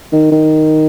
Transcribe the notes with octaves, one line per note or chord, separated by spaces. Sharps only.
D#3
D#3